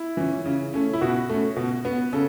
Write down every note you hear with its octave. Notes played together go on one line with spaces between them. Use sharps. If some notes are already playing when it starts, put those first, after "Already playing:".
Already playing: E4
E3 C#4
C#3
A3 C#4
E4
B2 F#4
A3 C#4
B2
B3
C#3 A4